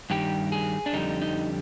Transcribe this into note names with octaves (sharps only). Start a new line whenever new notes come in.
G2 D#3 G3 G4
G#4
D4
F2 D3 G3 D#4
D#4